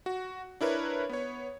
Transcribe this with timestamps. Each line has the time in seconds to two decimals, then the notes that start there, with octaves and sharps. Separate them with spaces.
0.06 F#4
0.61 D4 E4 A#4 B4 C#5
1.09 B3 C#5